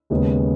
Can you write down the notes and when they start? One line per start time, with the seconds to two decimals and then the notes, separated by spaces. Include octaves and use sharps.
0.10 D#2 C#3 G#3 B3